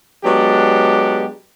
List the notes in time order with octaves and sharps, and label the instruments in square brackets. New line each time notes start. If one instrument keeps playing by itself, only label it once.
[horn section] F#3 G#3 B3 D4 G4